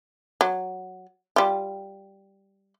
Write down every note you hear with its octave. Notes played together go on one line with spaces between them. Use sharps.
F#3
G3 F4